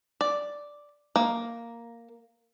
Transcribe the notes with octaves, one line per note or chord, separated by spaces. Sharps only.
D5
A#3